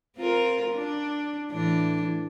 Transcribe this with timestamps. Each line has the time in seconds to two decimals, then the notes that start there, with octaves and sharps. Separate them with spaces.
0.17 C4 F4 A#4
0.74 D4
1.51 A2 E3 D4